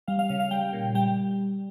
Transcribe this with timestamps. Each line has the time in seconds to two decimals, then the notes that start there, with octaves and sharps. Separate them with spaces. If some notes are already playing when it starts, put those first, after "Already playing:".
0.08 G3 F5
0.19 F5
0.29 C#3 F5
0.40 F5
0.51 G3 G5
0.73 A#2
0.95 G3 G5